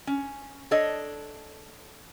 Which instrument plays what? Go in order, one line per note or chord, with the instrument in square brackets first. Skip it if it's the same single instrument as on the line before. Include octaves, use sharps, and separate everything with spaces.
[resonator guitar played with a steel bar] C#4
D4 A4 C#5 D#5